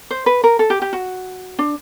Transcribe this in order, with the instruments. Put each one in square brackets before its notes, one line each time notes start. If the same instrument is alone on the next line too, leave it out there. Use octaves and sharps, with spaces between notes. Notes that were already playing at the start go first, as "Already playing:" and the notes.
[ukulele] C5
B4
A#4
A4
G4
G4
F#4
D4